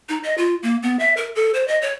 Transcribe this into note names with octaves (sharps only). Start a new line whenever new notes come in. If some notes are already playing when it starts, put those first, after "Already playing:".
D#4
D#5
F4
A#3
B3
E5
A#4
A4
C5
D#5
C#5